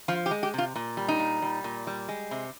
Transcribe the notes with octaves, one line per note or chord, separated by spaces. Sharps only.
F3 F4
G4
G#3
G4
C3 F4
A#2
G3
D#4
A#2
G3
A#2
G3
G#3
C3